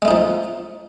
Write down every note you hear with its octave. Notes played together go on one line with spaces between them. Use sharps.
F3 G#3 A3 D#4